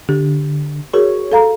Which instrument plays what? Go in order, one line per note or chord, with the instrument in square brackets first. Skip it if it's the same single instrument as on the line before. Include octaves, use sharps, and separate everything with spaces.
[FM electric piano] D3 [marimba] G4
[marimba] F#4 G#4 A#4 [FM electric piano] C#5
[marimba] A4 F5 A#5